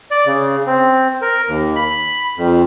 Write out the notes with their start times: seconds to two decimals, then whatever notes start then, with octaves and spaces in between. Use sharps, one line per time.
0.11 D5
0.26 C#3
0.67 C4
1.21 A#4
1.48 D#2
1.76 B5
2.37 F2